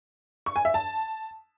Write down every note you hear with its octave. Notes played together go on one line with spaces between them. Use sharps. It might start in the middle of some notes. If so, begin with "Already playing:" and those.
C#6
G#5
E5
A5